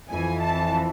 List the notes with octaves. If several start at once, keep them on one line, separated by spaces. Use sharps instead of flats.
F2 E3 G#5
A5